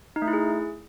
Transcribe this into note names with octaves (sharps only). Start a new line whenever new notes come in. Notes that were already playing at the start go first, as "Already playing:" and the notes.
D#4
A3
E4
G#4